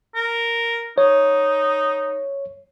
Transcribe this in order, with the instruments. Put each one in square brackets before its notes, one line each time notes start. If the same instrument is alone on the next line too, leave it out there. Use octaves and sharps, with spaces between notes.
[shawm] A#4
[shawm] D#4 [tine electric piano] C#5